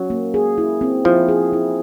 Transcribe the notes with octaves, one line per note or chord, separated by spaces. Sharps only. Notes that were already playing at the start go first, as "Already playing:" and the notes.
Already playing: F#3 C#4
A#3
G#4
E4
C4
F3 E4
G#4
E4